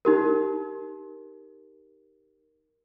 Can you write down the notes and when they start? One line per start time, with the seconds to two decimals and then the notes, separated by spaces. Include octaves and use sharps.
0.05 D#4 G4 A#4